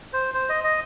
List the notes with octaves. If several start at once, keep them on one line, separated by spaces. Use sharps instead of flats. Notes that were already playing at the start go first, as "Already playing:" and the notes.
C5
C5
D#5
D#5